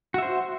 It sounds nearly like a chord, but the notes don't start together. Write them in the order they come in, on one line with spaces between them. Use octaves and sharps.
F#4 E5 C5